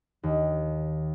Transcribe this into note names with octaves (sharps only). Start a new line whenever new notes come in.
D#2